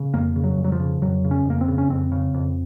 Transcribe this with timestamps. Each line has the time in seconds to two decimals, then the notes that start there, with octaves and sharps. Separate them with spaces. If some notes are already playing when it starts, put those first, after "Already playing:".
Already playing: C#3
0.14 F2 A#3
0.36 C#3
0.44 F#3
0.58 F2
0.64 F#3
0.72 F3
0.80 C#3
1.02 F2 F#3
1.24 C#3
1.31 C#4
1.45 F2 A#3
1.61 C4
1.68 C#3
1.78 C#4
1.89 F2 C4
2.12 C#3
2.34 F2